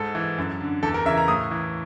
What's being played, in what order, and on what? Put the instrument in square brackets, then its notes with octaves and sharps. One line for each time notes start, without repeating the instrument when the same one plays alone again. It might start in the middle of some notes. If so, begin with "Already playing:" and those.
Already playing: [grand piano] G#2 A4
E3
F#2
D3
E2 A4
A#4
C#3 E3 E5
A#5
A2 D#6
E3